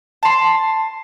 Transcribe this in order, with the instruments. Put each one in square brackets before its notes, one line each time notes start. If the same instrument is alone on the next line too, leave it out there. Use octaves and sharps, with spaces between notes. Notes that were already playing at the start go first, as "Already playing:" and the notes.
[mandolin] A5 C6